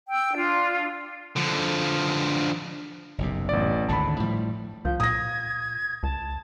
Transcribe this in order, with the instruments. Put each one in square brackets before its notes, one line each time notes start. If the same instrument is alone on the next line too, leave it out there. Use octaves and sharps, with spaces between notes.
[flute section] G5 E6
D4 F4
[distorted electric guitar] D3 F3
[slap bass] F#1 B1 C3
[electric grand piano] A1 D5
[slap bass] G#1 D2 D3 [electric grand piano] A5 B5
[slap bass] A2 F3 G3
[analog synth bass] C#2 [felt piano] F3 [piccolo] G6
[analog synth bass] A#2 [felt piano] D#6 A#6 [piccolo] G#6
[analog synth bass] C#2 [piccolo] A5